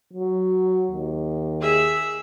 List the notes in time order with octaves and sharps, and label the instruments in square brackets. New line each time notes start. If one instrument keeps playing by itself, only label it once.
[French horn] F#3
D#2
[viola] G#4 E5